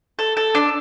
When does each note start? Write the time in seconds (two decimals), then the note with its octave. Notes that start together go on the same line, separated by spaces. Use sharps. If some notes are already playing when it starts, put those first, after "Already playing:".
0.19 A4
0.37 A4
0.55 D4